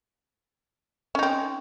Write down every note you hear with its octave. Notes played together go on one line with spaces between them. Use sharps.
C4 C#4 D#4